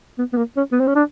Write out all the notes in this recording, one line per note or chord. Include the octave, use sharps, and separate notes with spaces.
B3
B3
A#3
C#4
B3
C4
C#4
D4